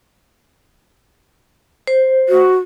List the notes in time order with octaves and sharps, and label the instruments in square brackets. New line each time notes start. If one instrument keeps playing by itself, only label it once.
[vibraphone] C5
[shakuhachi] F#4